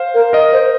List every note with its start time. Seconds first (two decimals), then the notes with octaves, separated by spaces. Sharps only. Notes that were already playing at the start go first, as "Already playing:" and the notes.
Already playing: C5 F5
0.14 A#4
0.33 A#4 D#5
0.53 C5